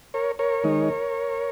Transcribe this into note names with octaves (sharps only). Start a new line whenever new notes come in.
A#4 C#5
A#4 C#5
D#3 G#3 D#4